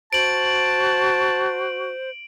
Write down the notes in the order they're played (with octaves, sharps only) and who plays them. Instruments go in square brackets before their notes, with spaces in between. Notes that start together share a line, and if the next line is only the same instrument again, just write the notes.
[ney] F#4 [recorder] C5 [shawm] A5 [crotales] D7 F#7